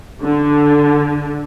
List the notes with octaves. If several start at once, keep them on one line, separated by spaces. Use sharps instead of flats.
D3